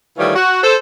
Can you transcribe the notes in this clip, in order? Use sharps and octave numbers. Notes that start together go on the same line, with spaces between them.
D#3 E3 G3 A3 F4 C#5
F#4
A4 C5